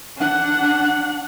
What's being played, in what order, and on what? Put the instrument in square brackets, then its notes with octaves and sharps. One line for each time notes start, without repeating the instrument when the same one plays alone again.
[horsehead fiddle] D4 F#5